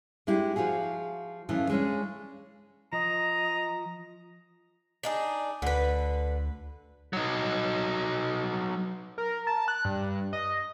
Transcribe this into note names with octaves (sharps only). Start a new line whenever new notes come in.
G#3 D4 E4 G4
F3 F4 F#4 G#4
C#3 E3 F3 A3 A4
G#3 B3 C#4 D4
F3 D#5 A#5
D4 D#4 G#4
D2 D3 B4
F#3 D#4
A#4
A5
F#6
G2
D#5